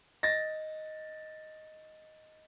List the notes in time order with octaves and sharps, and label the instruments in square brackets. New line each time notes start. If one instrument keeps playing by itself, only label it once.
[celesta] D#5 [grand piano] A6 A#6